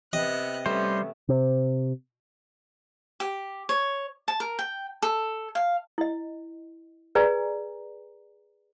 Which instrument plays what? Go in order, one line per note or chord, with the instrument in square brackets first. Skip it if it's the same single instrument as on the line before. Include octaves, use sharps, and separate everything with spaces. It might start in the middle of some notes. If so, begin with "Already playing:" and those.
[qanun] C3 [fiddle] B3 F#6 [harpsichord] D#5
[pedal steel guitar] G3 C5 [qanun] A3 [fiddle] B3 C#4
[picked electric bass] C3
[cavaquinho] G4
C#5
A5
A#4
G5
A4
F5
[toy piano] E4 D#5
G#4 B4 D5 G#5 A#5